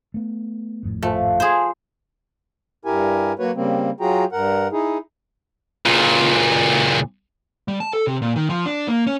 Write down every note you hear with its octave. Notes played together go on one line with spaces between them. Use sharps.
A3 B3
G#1 F2 A2
F3 A3 B4
G#4 C5
G2 E4 G4 A#4 G#5
F#3 A#3 F#4 B4 C#5
C#3 G3 A#3 C4
F#3 F4 F#4 G#4 G5 A#5
G2 A#4 F#5
D#4 E4 G#4
C#2 A#2
G3
A5
A4
C3
A#2
D#3
F3
D4
A#3
C#4